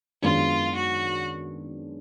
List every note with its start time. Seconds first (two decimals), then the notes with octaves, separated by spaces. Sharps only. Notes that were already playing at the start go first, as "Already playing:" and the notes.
0.22 F#2 D#3 G#3 B3 D4 F4
0.76 F#4